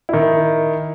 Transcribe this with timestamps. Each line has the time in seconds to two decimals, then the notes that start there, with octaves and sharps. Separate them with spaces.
0.09 D#3 E4